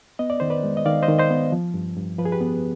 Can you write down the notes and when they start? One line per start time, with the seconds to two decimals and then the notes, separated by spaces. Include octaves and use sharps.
0.19 B3 D#5
0.30 D5
0.40 D#3 C5
0.50 B4 D5
0.63 G#3
0.77 D#5
0.86 D#3 D5 F5
1.03 C5 D#5
1.08 D#3
1.19 C5 D#5
1.30 B3
1.52 F3
1.74 G2
1.97 G2
2.18 F3 B4
2.25 G#4
2.32 G4 B4
2.41 B3